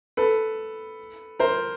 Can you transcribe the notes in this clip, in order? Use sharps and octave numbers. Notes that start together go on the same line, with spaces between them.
A4 B4
A#4 C5